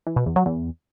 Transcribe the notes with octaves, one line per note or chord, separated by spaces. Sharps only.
E3
B2
E2
F#3
E2